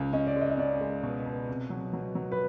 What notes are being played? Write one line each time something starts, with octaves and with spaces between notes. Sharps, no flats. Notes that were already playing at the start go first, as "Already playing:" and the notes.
Already playing: C#2 C#4
C#4 D#5
D5
G#3 D#5
D#5
C#4 D5
G#3
B2
B2
C3
F#3
F#3
F#3
B4